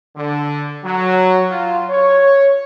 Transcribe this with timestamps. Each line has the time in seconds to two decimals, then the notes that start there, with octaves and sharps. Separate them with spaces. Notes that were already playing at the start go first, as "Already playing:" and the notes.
0.16 D3
0.84 F#3
1.50 F4
1.89 C#5